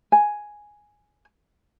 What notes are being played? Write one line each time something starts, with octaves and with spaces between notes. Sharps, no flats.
G#5